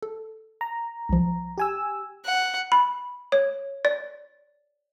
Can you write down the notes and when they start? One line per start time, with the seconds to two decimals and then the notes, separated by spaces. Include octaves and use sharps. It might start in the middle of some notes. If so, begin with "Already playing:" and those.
0.02 A4
0.61 A#5
1.09 C2 F3
1.58 G4 G#5 E6
2.25 F#5
2.72 B5
3.32 C#5
3.85 D5